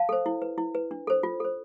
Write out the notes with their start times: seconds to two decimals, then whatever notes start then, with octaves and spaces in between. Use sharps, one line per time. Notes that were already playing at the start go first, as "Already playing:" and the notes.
Already playing: F5 A5
0.09 A4 C5
0.26 E4
0.42 B4
0.58 E4
0.75 B4
0.91 D4
1.07 A4 C5
1.23 F4
1.40 A4 C5